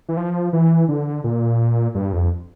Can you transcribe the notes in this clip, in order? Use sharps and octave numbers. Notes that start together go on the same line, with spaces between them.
E3
F3
E3
D3
A#2
G2
F2